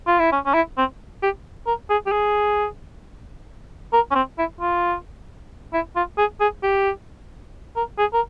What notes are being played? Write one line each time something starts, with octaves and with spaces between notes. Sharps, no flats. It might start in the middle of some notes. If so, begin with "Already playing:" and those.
F4
E4
C#4
C#4
E4
C4
G4
A#4
G#4
G4
G#4
A#4
C#4
C4
E4
F4
E4
F4
G#4
G#4
G4
A#4
G#4
A#4